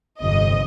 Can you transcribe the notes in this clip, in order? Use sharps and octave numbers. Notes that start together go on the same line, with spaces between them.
G1 F2 C3 D#5